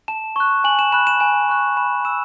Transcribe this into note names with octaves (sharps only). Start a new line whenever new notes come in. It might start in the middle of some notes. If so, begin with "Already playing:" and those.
A5 E7
C#6 F#6
G#5 F#7
E7
B5 F#6 E7
E7
G#5 E7
C#6 F#6
B5 E7
E6 E7